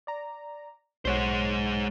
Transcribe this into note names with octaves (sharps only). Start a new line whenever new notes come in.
D5 A#5
B1 G#3 C5 C#5 F#5